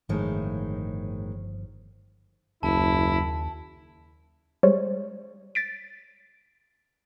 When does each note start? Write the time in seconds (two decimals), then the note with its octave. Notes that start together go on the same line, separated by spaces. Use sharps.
0.09 G1 A2 D#3 F3 G#3
2.63 F#1 D#2 E4 A5
4.63 G3 G#3 C5 C#5
5.55 A6 B6 D7